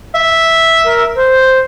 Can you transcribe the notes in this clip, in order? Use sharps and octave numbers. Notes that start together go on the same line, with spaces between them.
E5
A#4
C5